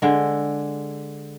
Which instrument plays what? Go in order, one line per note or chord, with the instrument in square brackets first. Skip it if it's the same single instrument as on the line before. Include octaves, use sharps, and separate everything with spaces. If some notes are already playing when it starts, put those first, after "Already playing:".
[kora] D3 G#3